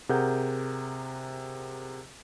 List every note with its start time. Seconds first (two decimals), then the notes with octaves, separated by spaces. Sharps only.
0.09 C3 G#4 A#4 F#5 G6